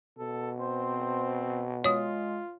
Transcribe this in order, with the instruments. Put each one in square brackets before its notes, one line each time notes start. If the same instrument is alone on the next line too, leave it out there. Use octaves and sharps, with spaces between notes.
[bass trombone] B2 [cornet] A4
[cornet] C4 [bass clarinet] C5
[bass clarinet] G#3 [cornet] F4 [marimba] C#5 D#6